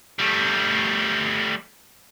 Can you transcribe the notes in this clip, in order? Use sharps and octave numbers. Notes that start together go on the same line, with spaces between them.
G3 A3